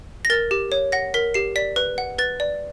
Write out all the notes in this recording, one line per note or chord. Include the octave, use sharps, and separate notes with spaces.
A#6
A#4 A6
G4
C#5
F#5 A#6
A#4 B6
G4 C7
D5 B6
B4
F#5
B4 A6
D5